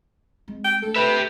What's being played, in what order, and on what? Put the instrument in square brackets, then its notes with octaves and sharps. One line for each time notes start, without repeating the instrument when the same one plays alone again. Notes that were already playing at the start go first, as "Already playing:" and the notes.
[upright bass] G#3 C4
[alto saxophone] G5
[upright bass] A3 D4 [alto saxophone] A4
[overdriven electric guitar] G4 E5 [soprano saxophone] B4